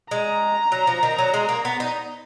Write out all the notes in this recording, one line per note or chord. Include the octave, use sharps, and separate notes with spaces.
G#3 A#5
F#3
F3
D#3
F#3
G#3
A#3
B3
D#4